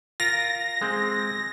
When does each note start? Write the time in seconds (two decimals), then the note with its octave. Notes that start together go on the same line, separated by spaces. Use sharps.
0.20 F4 A#4 A#6
0.82 G#3 C4